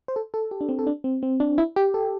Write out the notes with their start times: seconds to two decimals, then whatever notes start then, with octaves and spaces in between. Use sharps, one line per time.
0.08 C5
0.16 A4
0.34 A4
0.51 G4
0.61 D4
0.69 C4
0.79 A4
0.87 D4
1.04 C4
1.23 C4
1.40 D4
1.58 E4
1.76 G4
1.94 A4